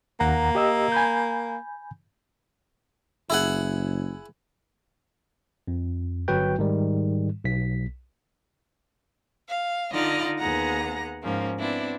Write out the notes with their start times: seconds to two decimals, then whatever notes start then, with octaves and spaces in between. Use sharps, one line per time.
0.20 D#2 A#3 F#5 A#5
0.55 G4 D#5 E6
0.92 G#5 B5 G6
3.30 F#1 E4 G#4 F#5
5.68 F2
6.28 G1 F#3 F#4 B4 G5 G6
6.58 G#2 D#3 G3
7.44 B1 B6
9.48 F5
9.90 D3 D#4 F4 D5 D#5 F6
10.39 D#2 B3 G#4 F#5 A#5 A#6
11.23 G#2 F3 A#3 C#4
11.58 B3 C4 D4 E4 D5